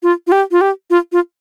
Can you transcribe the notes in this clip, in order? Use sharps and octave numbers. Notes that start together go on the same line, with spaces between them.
F4
F4
G4
F4
G4
F4
F4